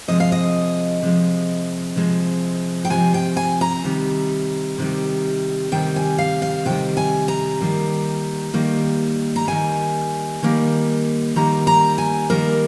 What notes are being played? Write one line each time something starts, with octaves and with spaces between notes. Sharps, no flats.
C3 F3 G#3 D#5
F5
D#5
C3 F3 G#3
C3 F3 G#3
G5
C3 F3 G#3 G#5
G5
G#5
A#5
C3 D#3 G3
C3 D#3 G3
C3 D#3 G3 G5
G#5
F5
F5
C3 D#3 G3 G5
G#5
A#5
D#3 G3 A#3
D#3 G3 A#3
A#5
D#3 G3 A#3 G#5
D#3 G3 A#3
D#3 G3 A#3 A#5
A#5
G#5
D#3 G3 A#3 A#4